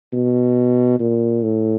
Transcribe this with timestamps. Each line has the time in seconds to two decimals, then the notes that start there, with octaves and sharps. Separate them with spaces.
0.13 B2
1.00 A#2
1.43 A2